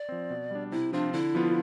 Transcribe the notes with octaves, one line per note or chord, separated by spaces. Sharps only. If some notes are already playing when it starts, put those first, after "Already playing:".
Already playing: D5
F3 C4
B2
G3 D4
C3 E4
F3 C4 D4 F4
D3 E4
F3 B3 F4